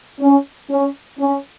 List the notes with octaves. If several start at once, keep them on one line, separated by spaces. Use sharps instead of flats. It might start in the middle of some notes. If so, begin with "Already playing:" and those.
C#4
C#4
C#4